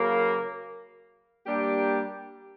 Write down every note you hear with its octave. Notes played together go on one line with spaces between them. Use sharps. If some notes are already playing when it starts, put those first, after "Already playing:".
Already playing: C#3 F#3 A#3
G3 A#3 D4 G4